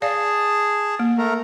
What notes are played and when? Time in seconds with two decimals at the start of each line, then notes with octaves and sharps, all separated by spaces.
0.02 G#4 D5 F5 A5
0.99 A#3
1.18 A3 A#4